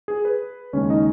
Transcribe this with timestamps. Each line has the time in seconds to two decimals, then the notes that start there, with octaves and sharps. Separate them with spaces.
0.08 G#4
0.25 B4
0.73 D#2 C#3 G#3 C#4 C#5
0.90 D#4 D#5